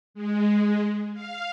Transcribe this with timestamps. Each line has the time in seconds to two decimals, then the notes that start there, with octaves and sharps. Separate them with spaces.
0.14 G#3
1.14 F5